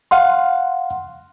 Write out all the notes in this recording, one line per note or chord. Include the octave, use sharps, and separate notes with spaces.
F5 F#5 C6